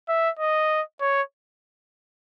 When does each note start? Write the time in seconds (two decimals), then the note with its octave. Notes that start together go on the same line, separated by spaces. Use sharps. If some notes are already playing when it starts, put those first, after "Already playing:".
0.09 E5
0.39 D#5
1.01 C#5